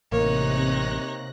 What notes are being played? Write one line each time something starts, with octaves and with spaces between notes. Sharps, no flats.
A1 C3 A#3 D#4 C#5 F#6 A#6